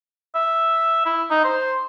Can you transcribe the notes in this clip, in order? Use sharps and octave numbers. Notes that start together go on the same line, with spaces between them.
E5
E4
D#4
C5